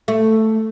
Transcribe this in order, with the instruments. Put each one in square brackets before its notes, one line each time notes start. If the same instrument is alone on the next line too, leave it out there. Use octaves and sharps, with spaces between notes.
[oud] A3